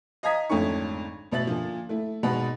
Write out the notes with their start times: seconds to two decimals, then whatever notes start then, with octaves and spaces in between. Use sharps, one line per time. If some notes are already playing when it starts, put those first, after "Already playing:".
0.23 D#5 F5 A#5 D#6 G#6 B6
0.50 G#1 F2 D3 A3 C#4 C#6
1.31 A1 B2 E5 A6 F#7
1.47 A#2 D3 F3
1.89 A3 E4
2.23 G#1 B2 G#3 F#5 B5